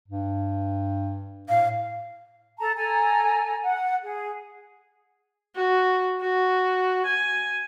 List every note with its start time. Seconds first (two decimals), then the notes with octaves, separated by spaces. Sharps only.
0.08 G2
1.49 A2 F5
2.60 A4 A5 A#5
2.76 A4 G#5 A#5
3.62 F#5
4.03 G#4
5.56 F#4
6.22 F#4
7.06 G#5